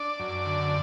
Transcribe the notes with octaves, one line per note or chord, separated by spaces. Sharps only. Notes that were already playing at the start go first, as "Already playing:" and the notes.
Already playing: D4 D5
F#2
D3